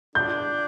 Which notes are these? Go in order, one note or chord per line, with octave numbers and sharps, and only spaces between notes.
D4 G6